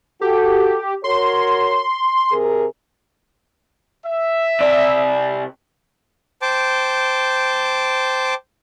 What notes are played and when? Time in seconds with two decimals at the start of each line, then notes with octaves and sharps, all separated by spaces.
0.21 F#4 G4 A4
1.04 F#4 A#4 C#5 C6
2.32 C3 G#4 A#4
4.06 E5
4.60 C3 D5
6.42 C5 G5 A5 D6